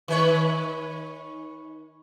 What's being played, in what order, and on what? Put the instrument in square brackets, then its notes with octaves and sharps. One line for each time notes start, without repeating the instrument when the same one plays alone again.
[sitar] D#3 B4 C#5